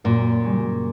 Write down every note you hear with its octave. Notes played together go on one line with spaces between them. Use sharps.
F#2 A#2
C#3 G3 C#4 F#4